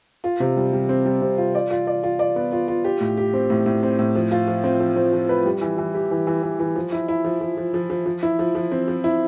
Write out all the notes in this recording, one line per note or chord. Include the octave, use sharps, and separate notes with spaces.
F4
C3
G3
G3
C4
G3
C3
F4
D5
F4
D5
F4
D5
B3
F4
F4
G4
A2
G4
C4
A2
A2
C4
A2
F3
F4
F3
C4
F3
C4
F3
B4
G3
E3
E3
G4
E3
E3
E3
E3
F3
E4
E4
F3
F3
F3
F3
F3
F3
E4
F3
F3
C4
F3
E4